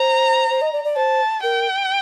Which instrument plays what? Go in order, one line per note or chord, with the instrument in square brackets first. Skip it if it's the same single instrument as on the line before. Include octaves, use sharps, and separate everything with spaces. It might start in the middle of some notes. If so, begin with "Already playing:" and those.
Already playing: [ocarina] C5 [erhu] A#5
[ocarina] C5
D#5
D5
D5
[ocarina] C5 [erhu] A5
[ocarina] A#4 [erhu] G5